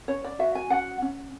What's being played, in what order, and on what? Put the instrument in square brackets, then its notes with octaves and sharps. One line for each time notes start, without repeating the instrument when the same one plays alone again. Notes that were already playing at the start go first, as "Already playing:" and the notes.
[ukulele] C#4 C#5
D5
F#4 E5
G#5
C#4 F#5
C#4